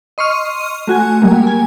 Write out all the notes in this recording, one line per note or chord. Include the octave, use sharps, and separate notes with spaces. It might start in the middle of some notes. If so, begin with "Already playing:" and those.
D#5 C6 C#6 F6 D#7
A3 F#4 G#5
F#3 G3 A#3
G#5